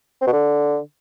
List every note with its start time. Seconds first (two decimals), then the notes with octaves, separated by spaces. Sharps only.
0.21 C4
0.27 B2
0.32 D3